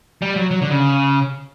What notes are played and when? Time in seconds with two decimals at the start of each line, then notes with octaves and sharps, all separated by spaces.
0.22 G3
0.36 F#3
0.51 F#3
0.62 D3
0.70 C#3